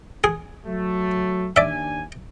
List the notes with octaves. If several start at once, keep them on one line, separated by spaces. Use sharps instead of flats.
G#4
F#3 A3
D#2 D4 D5 E5 G#5